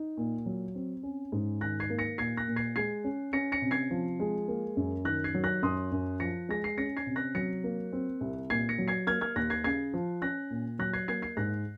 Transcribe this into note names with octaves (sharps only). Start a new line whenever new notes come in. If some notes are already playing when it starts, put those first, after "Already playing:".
Already playing: D#4
A#2
F#3
C4
C#4
G#2
D#3 F#6 A#6
G#6 C7
A#3
A#6 C#7
A#2 G#6 C7
F#6 A#6
A#2
G#6 C7
G#3 G#6 C7
C#4
C#4 A#6 C#7
A#6 C#7
C3
G#6 C7
F3
G#3
A#3
F#2
D#3 F#6 A#6
G#6 C7
F#3
F#6 A#6
F#2 C6 D#6
F#2
F3 A#6 C#7
G#3 A#6
C7
C#4 A#6 C#7
G#6 C7
C3
F#6 A#6
F#3 A#6 C#7
A#3
C4
C2
A#2 G#6 C7
A#6 C#7
F#3
G#6 C7
A#3 F6 G#6
F6 G#6
D#2 F#6 A#6
G#6 C7
C#3 G#6 C7
F3
C#4 F#6 A#6
A#2
F#3 F#6 A#6
G#6 C7
A#3 G#6 C7
G#6 C7
G#2 F#6 A#6